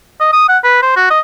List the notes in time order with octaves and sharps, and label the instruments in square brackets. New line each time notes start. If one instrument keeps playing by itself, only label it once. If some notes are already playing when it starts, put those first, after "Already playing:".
[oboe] D#5
D#6
F#5
B4
C5
F#4
D#5